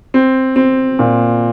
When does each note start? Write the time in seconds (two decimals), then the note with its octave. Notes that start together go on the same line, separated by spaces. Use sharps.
0.14 C4
0.56 C4
0.99 A#2